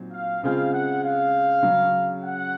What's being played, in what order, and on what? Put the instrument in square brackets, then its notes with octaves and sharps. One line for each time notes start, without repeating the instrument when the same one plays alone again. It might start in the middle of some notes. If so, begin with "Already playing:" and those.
Already playing: [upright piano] A#2 F#3 C4 D#4
[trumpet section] F5
[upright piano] C#3 G#3 C4 F4 G#4 [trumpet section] F5
[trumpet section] F#5
F5
[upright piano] C#3 F#3 C#4
[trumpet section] F#5